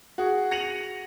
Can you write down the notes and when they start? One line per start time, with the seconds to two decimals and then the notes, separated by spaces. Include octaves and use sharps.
0.18 F#4 G#4
0.51 A#6 C#7 D#7 F7 F#7